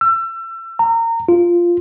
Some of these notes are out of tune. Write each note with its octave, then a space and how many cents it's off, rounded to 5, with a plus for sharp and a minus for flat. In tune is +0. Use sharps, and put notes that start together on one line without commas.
E6 +30
A#5 -25
F4 -5